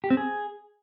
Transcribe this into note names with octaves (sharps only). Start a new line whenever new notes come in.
G4
C4
G#4